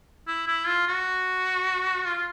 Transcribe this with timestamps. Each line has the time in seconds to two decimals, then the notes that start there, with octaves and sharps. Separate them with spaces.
0.27 E4
0.48 E4
0.67 F4
0.88 F#4
2.05 F4